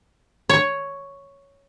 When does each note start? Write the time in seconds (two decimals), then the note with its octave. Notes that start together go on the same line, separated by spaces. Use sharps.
0.49 C#5